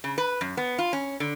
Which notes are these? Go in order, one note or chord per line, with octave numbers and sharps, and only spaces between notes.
C#3
B4
F#2
B3
F4
C#4
D3